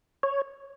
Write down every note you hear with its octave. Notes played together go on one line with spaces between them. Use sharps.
C#5